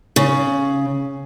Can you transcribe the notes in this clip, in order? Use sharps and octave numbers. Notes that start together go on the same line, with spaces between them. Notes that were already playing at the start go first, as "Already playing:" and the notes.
C#3